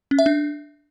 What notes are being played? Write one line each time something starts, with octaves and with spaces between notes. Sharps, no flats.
C#4
E5
D4